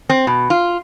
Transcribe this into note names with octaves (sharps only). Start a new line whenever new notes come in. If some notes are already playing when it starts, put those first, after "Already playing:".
C4
B2
F4